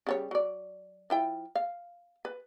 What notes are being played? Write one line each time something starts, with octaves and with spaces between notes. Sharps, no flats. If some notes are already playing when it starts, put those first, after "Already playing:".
C#3 G3 C#5
F#3 D5
F3 E4 G5
F5
B4